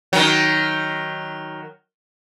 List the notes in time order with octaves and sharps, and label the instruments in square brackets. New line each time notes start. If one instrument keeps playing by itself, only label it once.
[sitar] D#3 F#3